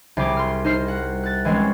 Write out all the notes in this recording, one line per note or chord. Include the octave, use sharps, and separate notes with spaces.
C2 G3 G#4 D6
C6 F6
D#4 C5 F6 C7
F#5
F#6 A6
E3 G#3 C4 C#4